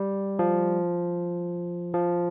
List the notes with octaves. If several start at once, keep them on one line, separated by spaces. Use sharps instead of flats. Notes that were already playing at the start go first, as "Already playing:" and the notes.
Already playing: G3
F3
F3